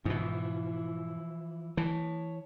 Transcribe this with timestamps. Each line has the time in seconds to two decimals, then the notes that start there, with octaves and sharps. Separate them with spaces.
0.05 G#2 B2 E3 F3 E4
1.77 E3 C#5 A5